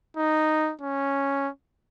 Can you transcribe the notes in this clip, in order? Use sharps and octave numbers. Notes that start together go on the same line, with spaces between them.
D#4
C#4